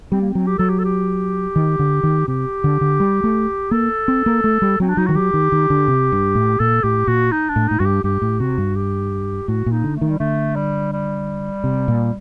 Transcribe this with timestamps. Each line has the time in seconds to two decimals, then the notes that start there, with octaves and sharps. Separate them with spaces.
0.12 G3 C4
0.21 A#3
0.31 F#3 C4
0.47 G4
0.58 F#3 A4
0.69 G4
0.79 A4
0.84 G4
1.56 D#3
1.79 D3
2.03 D#3
2.28 C3 G4
2.64 D3
2.81 D3
3.00 G3
3.24 A3
3.71 A#3 A4
4.08 C4
4.26 A#3
4.44 A3
4.62 G3
4.80 F#3 C4
4.89 D4
4.97 F#3 D#4
5.06 D#3 F#4
5.15 F#3 G4
5.34 D#3
5.52 D#3
5.70 D3
5.88 C3
6.12 G2
6.35 A2
6.59 A#2 A4
6.84 A2 G4
7.07 A#2 F#4
7.32 D#4
7.49 D4
7.56 A2
7.68 A2 D#4
7.79 G2 F#4
7.85 G4
8.04 G2 G4
8.22 A2
8.40 C3 F#4
8.58 G2
8.76 G4
9.48 A2 F#4
9.66 A#2
9.72 D#4
9.83 D3
9.96 A3
10.01 D#3
10.10 G3
10.20 D3 A3
10.56 G3
10.92 G3
11.64 C3
11.88 A#2